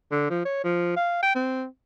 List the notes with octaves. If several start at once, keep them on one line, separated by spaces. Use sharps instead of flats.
D3
F3
C#5
F3
F5
G5
C4